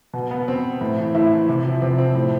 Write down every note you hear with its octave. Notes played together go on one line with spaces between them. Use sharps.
B2
B3
B2 C4
A2
E3
A2 E4
E3
C3
F3
C3 C4
F3 C4
A2